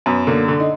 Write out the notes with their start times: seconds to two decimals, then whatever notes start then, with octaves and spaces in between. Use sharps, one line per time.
0.06 F#2 B3
0.27 D3 A#3
0.48 D3
0.60 D#4